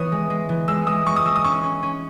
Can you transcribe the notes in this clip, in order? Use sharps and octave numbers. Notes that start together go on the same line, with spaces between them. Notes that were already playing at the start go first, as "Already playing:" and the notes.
Already playing: E3 B3 C#5 D#6
G#3
G#3
E3
G#3 E6
G#3 D#6
G#3 C#6
D#6
G#3 E6
D#6
C#4 C#6
C#4
C#4